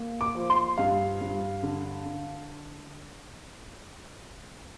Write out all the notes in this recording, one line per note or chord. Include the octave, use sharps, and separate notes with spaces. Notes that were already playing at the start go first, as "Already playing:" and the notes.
Already playing: A#3
D6
F3
C6
G2 F5
G2
D3
D3